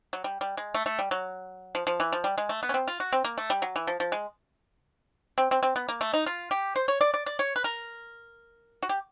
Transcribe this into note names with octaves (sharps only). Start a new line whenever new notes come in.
F#3
G3
G3
G#3
A3
A3
G3
F#3
F3
F3
E3
F3
G3
G#3
A3
B3
C#4
C4
F4
F#4
C4
A#3
A3
G3
F#3
E3
F3
F3
G#3
C4
C4
C4
B3
A#3
A3
D#4
F4
G4
C5
C#5
D5
D5
D5
C#5
B4
A#4
F#4
G4